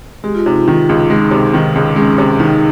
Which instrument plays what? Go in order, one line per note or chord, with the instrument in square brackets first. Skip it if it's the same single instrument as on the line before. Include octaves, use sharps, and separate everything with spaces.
[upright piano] G#3 [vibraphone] G4
[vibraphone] F4
[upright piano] C3 [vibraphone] D#4
[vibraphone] F4
[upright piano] D#3
C#2
[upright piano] G#3 [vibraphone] D#4
[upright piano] C3
D#3
C#2
[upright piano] G#3 [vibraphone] C#4
[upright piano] C3
[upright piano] D#3 [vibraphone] D#4